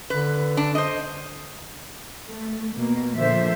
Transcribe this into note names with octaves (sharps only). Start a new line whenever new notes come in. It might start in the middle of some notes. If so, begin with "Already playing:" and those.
D3 B4
D4
C5 D#5
A3
B2 A#3
A#2 D3 F3 C5 E5